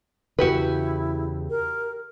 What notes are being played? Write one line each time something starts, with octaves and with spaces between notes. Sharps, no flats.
E2 C#3 E4 F#4 G4 B4
A#4